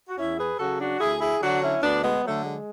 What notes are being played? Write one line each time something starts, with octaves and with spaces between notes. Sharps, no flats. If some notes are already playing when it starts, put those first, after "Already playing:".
F#4
E2 C#4 E4
G#4 B4
C#3 F#3 F#4 A4
D4 F#4
D2 E4 G#4
E4 G#4
D3 F#3 D4 F#4
C#4 E4
D2 B3 D4
G#3 B3
D3 F#3 A3
G#3